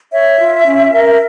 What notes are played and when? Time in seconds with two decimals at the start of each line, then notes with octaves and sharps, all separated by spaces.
0.13 C#5 E5
0.39 F4
0.66 C#4
0.92 A#4